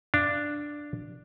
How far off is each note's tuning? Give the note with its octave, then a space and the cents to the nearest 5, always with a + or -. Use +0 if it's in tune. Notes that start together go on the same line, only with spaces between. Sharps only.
D4 +0 F5 -30